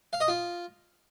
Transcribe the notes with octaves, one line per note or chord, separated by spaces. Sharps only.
F5
D#5
F4